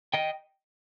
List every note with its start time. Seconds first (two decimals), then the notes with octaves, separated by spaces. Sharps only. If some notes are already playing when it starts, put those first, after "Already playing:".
0.14 D#5 G5